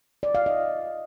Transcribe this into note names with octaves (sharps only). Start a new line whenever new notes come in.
D5
F5
D#5